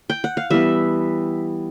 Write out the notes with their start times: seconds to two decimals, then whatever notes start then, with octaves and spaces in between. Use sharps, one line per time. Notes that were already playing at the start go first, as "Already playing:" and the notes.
0.10 G5
0.24 F#5
0.37 F5
0.50 E3 G3 B3 E5